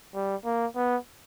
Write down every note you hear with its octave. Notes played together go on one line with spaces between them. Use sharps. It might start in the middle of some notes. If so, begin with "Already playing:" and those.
G3
A#3
B3